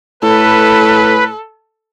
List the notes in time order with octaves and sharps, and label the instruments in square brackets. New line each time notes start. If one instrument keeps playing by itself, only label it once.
[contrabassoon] A2 [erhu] A4 [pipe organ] B4